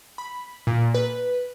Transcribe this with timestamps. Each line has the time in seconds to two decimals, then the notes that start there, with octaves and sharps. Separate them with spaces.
0.18 B5
0.67 A#2
0.95 B4